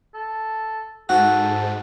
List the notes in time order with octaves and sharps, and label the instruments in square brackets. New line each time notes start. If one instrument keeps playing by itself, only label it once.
[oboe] A4
[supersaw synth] G#2 [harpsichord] F#4 [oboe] A4